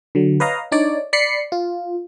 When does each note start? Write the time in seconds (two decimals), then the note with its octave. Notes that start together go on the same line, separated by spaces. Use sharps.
0.15 D3 F#3
0.40 B4 C#5 D#5 F5 A#5
0.72 D4 D#4 C#5 D5
1.13 D5 B5 C7 C#7
1.52 F4